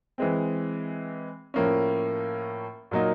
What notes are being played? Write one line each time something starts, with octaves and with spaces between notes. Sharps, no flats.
E3 G#3 C4
A2 F3 A#3 C#4
A#2 F#3 A#3 D#4